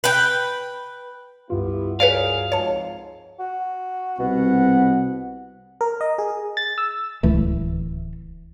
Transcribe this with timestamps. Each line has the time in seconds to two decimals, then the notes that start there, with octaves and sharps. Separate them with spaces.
0.04 B4 G5
1.50 C#2 G2 B3 E4 F4 G4
2.00 F#4 G#4 A#4 B4 C#5 D5 F5
2.52 F2 G#2 C#5 A5
3.39 F#4
4.19 C2 B2 C4 F#5
5.81 A#4
6.01 D#5
6.18 G#4
6.57 A6
6.78 E6
7.23 D1 C#2 E3 A3